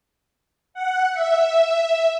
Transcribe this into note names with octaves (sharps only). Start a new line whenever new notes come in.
F#5
E5